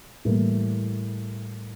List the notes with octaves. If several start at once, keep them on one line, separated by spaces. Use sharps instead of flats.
A2 E3 G3 A#3